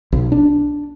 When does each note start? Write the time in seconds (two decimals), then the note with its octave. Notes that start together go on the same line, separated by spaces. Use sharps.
0.12 B1
0.32 D4